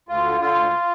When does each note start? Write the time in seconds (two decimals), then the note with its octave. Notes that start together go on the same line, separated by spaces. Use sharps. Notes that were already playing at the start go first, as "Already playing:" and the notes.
0.09 D2 F4
0.24 D3
0.40 D3 F4
0.56 D2